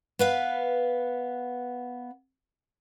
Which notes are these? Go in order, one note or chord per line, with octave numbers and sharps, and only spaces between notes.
B3 B4 F5